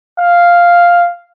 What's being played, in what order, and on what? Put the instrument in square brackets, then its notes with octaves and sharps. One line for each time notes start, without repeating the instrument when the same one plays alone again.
[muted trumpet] F5